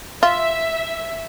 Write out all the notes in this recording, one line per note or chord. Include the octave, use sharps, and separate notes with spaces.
F4 E5